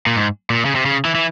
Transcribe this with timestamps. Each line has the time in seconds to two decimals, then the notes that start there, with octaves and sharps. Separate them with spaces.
0.07 A#2
0.16 G#2
0.50 A#2
0.65 C#3
0.75 C3
0.86 C#3
1.05 E3
1.15 E3